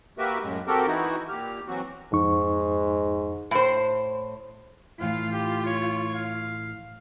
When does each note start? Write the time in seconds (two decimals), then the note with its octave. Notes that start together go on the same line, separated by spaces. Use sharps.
0.18 A#3 F#4 G4 A#4 B4 E5
0.42 F#2 A2 G#3
0.67 C4 F#4 G4 A4 A#4
0.87 E3 D#4 E4 F#4
1.29 A#2 G4 F6
1.68 E3 F#3 C4 F#4
2.13 F2 G#2 D#4 C#6
3.51 A2 C5
5.01 A2 E3 F4 F5
5.32 G4
5.66 C#5
6.14 F5